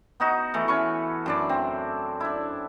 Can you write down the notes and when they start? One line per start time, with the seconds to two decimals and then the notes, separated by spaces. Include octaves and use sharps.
0.20 B3 D#4 F#4
0.54 E3 A3
0.68 C#4 B4 C#6
1.26 F#2 D4 D5
1.49 C4
2.20 D4 E4